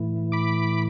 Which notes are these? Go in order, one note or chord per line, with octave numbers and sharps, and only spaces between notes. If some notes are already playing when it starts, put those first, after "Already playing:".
Already playing: A2 E3
B5 D6